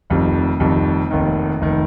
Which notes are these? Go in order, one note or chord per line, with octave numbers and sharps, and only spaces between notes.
F1 F2 D#3 G3
F1 F2 D#3 G3
F1 D#2 D#3
F1 D#3